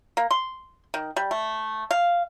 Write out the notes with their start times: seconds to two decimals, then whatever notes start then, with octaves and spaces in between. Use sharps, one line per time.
0.17 A#3
0.31 C6
0.94 D#3
1.16 G3
1.31 A3
1.91 F5